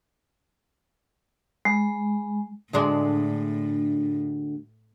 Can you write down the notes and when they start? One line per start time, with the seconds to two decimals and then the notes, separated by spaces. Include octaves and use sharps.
1.65 G#3
2.73 D2 A2 G#3 D4